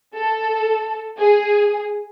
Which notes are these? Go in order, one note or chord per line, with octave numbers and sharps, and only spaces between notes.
A4
G#4